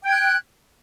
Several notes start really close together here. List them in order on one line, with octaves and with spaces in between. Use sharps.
G5 G#6 F#6